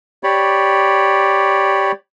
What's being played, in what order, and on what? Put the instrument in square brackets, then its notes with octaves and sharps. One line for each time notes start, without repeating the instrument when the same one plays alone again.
[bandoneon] G4 C#5 D5 B5